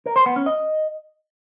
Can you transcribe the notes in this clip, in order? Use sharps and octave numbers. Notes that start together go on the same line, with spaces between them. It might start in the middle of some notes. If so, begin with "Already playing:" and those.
A#4
C5
B3
C#4
D#5